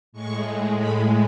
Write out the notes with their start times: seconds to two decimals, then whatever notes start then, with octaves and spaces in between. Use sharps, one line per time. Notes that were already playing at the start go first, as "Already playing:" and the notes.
0.12 A2 G#3 C#6
0.78 B5